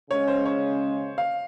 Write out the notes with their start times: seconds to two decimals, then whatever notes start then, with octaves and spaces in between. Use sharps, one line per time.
0.10 C#3 G#3 C#4 C#5
0.28 C5
0.46 C#5
1.18 F5